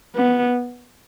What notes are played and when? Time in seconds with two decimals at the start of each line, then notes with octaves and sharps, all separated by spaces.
0.15 B3